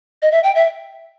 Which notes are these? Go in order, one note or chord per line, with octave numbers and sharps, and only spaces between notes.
D#5
E5
G5
E5